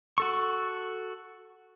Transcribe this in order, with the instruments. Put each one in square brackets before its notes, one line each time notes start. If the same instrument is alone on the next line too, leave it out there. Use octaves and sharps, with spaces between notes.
[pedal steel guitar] F#4 A4 C#6